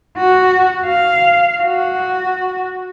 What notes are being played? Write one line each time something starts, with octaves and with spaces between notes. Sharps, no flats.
F#4
F5
F#4